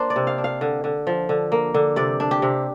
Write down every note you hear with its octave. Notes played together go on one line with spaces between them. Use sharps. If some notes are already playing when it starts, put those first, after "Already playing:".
Already playing: A#3 D4 C5
D5
C3
F5
D4
F5
D3
D3
F3
D3
A#3
D3
C3 D5
D4
G4
C3